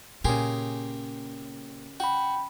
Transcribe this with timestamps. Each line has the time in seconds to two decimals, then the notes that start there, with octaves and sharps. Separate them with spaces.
0.24 A#2 C#3 G4 G#4 A#4 C6
2.00 F#4 G5 B5